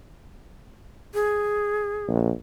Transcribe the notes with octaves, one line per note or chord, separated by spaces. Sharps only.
G#4
A#1